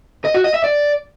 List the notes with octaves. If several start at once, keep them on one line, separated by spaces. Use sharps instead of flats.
D#5
F#4
D#5
E5
D5